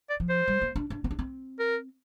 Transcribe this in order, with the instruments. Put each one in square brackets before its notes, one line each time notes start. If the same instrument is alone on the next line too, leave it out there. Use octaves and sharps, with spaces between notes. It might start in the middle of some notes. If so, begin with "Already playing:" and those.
[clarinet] D5
[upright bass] F3
[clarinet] C5
[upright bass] G3
A#3
D4
D4
C4
D4
C4
[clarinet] A#4